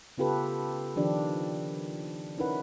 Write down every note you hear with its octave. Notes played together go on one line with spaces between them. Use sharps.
C#3 B3 F4 G4 A4 B4
D#3 F3 D4 G4
C#4 D#4 E4 A#4 B4 F#5